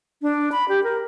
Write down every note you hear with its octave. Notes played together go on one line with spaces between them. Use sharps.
D4
B5
G4
A#4